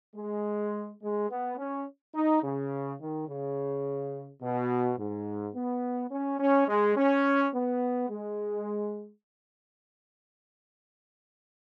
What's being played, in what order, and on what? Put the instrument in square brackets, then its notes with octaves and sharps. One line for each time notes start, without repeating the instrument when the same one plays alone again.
[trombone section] G#3
G#3
B3
C#4
D#4
C#3
D#3
C#3
B2
G#2
B3
C#4
C#4
G#3
C#4
B3
G#3